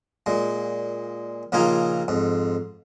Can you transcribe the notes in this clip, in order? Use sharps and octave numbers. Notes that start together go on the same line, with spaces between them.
A#2 G#3
A#1 C#3 A#3 D#4 F4 G#5
F2 G#2